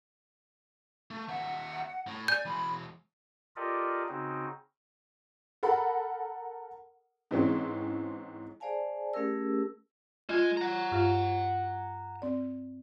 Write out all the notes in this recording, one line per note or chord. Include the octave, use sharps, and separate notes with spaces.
A3
D#2 E5 F#5
A2
D5 G#5 G6
E3 G#3 B5
F4 G4 A4 A#4 D5 D#5
C#3 C4 D#4 F#4
A4 A#4 F#5 B5
G#2 E3 C4 C#4
G#4 C5 D5 F5 G#5 A5
A3 C#4 G4 G#4 A#4 E6
G#3 F4 G#5
F#5 A#5
G2 F4 F5
C4 D5